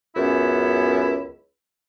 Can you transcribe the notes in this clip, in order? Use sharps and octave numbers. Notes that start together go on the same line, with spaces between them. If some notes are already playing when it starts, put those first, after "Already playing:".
C#2 F#2 B3 C#4 E4